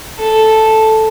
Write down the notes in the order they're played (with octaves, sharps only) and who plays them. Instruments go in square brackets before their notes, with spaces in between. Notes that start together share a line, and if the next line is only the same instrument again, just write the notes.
[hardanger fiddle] A4